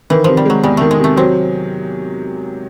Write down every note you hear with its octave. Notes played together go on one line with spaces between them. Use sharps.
D#3 E3
C3 F3
G3
F#3 G#3
E2 G3
D#3 A3
G#3
C3
A3
F#3 C4